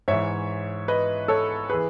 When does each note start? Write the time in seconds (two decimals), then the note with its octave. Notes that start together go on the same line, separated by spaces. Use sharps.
0.08 G#2 E3 C#5 E5
0.88 B4 D#5
1.28 A4 C#5
1.70 E3 G#4 B4